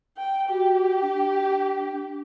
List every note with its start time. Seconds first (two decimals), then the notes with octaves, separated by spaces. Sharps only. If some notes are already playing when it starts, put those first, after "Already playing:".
0.17 G5
0.49 F#4 G4
1.02 D4